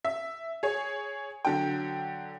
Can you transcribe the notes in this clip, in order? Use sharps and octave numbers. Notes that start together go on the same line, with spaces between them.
E5
G#4 C#5
D3 F#3 G5